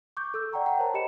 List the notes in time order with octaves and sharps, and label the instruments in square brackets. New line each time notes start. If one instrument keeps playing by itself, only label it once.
[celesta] C#6 D6 G6
A4 E6
D5 F#5 G5 A#5 C#6
F#5 G5 A#5
A#4 C5 C#5 A5 A#5
G4 C5 D#5 B5 C#7 E7